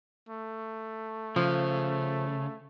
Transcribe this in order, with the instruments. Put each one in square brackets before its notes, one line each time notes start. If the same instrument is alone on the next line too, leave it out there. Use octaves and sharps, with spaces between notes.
[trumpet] A3
[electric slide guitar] C#3 [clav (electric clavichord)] F3